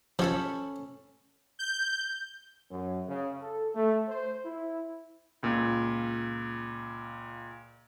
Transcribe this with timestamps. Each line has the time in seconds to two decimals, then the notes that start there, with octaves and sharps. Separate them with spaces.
0.19 F3 C#4 A4 B5
1.59 G6
2.70 F#2
3.07 C#3
3.41 A4
3.75 A3
4.08 C5
4.45 E4
5.43 C#2 A#2